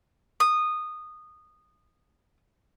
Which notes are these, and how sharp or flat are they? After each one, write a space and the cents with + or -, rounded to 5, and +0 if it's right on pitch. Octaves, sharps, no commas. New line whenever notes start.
D#6 -15